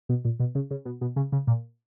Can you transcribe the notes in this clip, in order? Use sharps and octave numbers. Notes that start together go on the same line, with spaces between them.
B2
A#2
B2
C#3
C#3
B2
B2
C#3
C#3
A#2